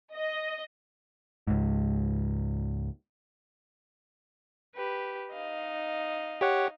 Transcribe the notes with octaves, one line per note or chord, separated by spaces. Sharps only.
D#5
C#2 G#2
G4 B4
D#4 D#5 F5
G4 C#5 F#5